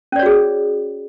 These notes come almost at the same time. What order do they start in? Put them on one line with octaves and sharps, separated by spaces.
C#4 D5 C#5 F#4 G#4